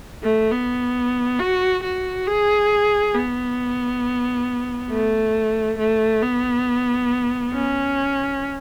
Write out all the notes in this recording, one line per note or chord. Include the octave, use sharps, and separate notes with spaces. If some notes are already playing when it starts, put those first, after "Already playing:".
A3
B3
F#4
F#4
G#4
B3
A3
A3
B3
C#4